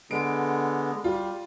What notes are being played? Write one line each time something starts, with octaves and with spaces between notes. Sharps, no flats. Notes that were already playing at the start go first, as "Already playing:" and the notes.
D3 G#3 B3 D7
G3 F4